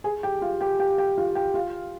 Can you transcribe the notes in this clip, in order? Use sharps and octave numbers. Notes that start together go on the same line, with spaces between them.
G#4 G#5
G4 G5
F4 F5
G4 G5
G4 G5
G4 G5
F4 F5
G4 G5
F4 F5